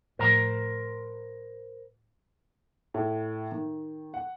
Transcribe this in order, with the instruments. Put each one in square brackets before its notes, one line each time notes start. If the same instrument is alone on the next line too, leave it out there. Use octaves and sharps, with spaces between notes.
[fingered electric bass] A2 F3 [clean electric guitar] A#4 C5 A#5
[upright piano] A2
D#3
F#5